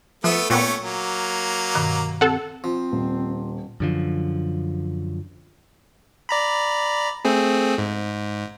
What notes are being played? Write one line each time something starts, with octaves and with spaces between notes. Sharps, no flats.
F3 A3 B3 A4 E5
A#2 A3 B3 C#4 C#5 G5 C6
F#3 A#3
G2 B2 D#3
C4 G4 A4 F#5
F3 C4
D#1
F#2 D3 F3
D5 A#5 B5
A3 C4 G#4
G#2